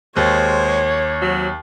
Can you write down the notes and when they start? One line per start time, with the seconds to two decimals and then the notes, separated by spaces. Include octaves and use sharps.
0.16 D#2 G#3 C5 C#5
1.21 C3 F#3